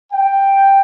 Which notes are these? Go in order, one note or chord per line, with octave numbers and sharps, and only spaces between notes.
G5